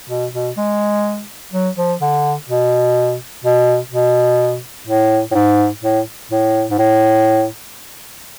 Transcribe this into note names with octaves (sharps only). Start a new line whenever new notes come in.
B2
B2
G#3
F#3
F3
D3
B2
B2
B2
A2
A2
G#2
A2
A2
G#2
A2